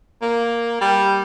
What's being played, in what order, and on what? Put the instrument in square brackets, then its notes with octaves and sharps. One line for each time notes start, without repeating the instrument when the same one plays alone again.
[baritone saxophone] A#3
G3